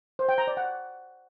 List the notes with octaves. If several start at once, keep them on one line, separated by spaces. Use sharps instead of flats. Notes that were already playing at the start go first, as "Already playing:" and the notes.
C5
G5
A#5
D5
F#5